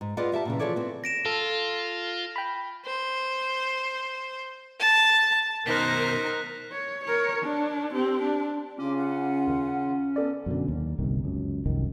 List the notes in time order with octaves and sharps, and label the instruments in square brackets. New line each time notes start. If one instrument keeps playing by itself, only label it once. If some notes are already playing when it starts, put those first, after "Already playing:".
[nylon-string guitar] G#2
F4 G#4 B4 D5 D#5 F#5
G4 E5 G5 A5
A#2 C#3 E3
E3 F3 G#4 A4 C#5 D5
B3 C4
[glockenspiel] A#6 D7 E7
[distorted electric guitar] F4 [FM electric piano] A4
[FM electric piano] G5 B5
[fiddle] C5
A5
[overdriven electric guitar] B2 D#3 [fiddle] D#4 C5 [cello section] A#4 [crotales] F#6 B6
[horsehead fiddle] C#5
A#4 C#5
D4
C4 G4
D4
[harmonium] C#3 F4 [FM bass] C#4 [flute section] D6
[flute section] F#5
[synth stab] D#2 D#3
B3 A4 D5
[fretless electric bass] F#2 B2 D3
D#2
G1 C2 C3 D#3
C#2 F#2
F1 C2 F#2 D#3